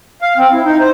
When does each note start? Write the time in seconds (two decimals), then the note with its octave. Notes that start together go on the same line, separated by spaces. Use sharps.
0.22 F5
0.37 C4
0.52 E4
0.64 D#4
0.80 C5